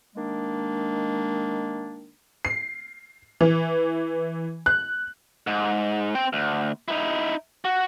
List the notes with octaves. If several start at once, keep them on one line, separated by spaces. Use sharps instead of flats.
D#3 G#3 A#3 D4
C7
E3
F#6
G#2
C4 G5
D2
D#4 E4
F#4